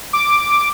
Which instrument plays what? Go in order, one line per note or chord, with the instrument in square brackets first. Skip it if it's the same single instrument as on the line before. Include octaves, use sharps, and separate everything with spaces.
[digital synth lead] D6